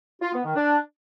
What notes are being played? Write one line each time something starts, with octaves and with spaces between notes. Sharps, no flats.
F4
B3
D#3
D4